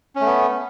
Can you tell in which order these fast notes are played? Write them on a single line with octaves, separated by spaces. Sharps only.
C#4 A3 B3